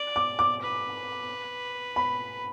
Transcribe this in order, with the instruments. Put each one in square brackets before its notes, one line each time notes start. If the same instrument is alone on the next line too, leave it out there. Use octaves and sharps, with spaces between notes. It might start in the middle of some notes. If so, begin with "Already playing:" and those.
Already playing: [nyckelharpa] D5
[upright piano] D6
D6
[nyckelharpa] B4
[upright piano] B5